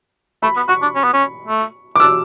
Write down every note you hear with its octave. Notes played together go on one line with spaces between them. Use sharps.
A3 B5
B3
F#4 C#6
D4
C#4
B3
C#4
A3
D6
D4 E6